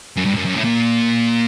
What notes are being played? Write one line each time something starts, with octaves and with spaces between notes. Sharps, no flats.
F#2
G2
F#2
F#2
A2
A#2